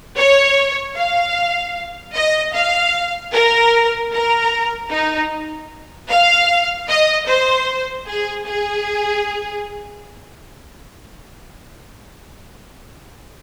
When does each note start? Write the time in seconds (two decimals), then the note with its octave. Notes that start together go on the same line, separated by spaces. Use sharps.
0.17 C#5
0.96 F5
2.14 D#5
2.54 F5
3.32 A#4
4.12 A#4
4.91 D#4
6.09 F5
6.88 D#5
7.27 C5
8.06 G#4
8.46 G#4